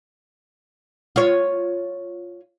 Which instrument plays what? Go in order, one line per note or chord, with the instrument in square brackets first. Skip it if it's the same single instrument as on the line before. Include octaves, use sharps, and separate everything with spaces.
[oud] F4 C#5